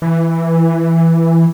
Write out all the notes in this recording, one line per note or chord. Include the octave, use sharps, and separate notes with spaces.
E3